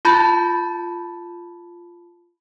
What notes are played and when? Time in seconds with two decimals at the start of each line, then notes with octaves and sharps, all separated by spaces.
0.05 F4 A5 B5 G6 A6